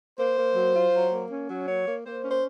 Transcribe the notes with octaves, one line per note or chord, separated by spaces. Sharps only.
A#3 C5
A#3
F#3
F4
F#3
A#3
C#4
F#3
A#3 C#5
A#3
A#3 C5
C#4
C5